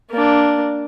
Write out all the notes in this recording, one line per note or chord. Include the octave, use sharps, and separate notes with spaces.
A#3 D4